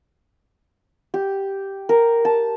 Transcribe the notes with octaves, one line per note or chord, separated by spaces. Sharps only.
G4
A#4
A5